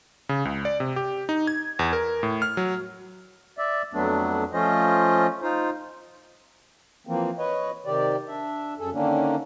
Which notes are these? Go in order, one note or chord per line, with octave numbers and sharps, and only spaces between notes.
C#3
C#2
D5
C3
G4
D#4
G#6
E2
A#4
A2
F6
F#3
D5 E5
F2 F#3 A3 B3 D4
F3 A3 C#4 F4 C5 D#5
D#4 F4 C5
E3 F3 A#3 C4
B4 C#5 D#5
C3 D#3 G4 D5
D4 E5
F#2 G#4 A4
D3 D#3 A#3 C#4 D4